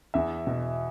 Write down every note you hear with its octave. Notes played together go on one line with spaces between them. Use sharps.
E2 E5
B2